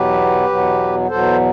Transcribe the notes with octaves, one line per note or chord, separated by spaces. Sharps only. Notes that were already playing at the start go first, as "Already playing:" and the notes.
Already playing: E2 B2 F#3 B3 G4 B4
E2 B2 F#3 B3
E2 B2 F#3 B3 A4 C5